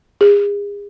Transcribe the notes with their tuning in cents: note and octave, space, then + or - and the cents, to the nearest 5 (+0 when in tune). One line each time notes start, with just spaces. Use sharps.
G#4 -35